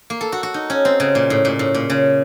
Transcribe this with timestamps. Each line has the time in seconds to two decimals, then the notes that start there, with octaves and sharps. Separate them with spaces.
0.10 A#3
0.21 A4
0.32 F#4
0.43 F#4
0.54 D#4
0.70 C#4
0.85 C4
1.00 C#3
1.15 A#2
1.30 A2
1.45 A#2
1.59 A2
1.74 A#2
1.90 C#3